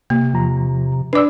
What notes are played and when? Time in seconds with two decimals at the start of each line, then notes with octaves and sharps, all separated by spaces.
0.10 C3 A#3
0.33 E2 F3 A#5
1.13 D4 B4 D5 D6 E6